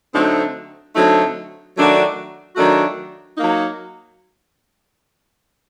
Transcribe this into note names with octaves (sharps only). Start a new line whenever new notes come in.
D3 F#3 A3 C4 D#4
D3 F#3 A3 C4 D#4
D#3 F#3 A3 D4 F#4
D#3 F#3 A3 D4 F#4
F#3 A#3 D#4